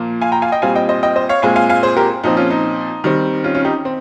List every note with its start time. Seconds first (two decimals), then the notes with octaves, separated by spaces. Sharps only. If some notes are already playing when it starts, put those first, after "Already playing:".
Already playing: A#2 F3 A#3
0.22 F5 G#5
0.32 G5 A#5
0.42 F5 G#5
0.52 D#5 G5
0.62 A#2 G3 C4 F5 G#5
0.75 D#5 G5
0.89 C5 D#5
1.03 D#5 G5
1.16 C5 D#5
1.29 C#5 F5
1.42 A#2 G#3 C4 F5 G#5
1.56 F5 G#5
1.69 F5 G#5
1.83 G#4 C5
1.97 G4 A#4
2.23 A#2 F3 C4 D#4
2.37 C#4 F4
2.50 D#4
3.04 D#3 G3 C4
3.44 C#4 F4
3.54 C#4 F4
3.64 D#4 G4
3.85 C4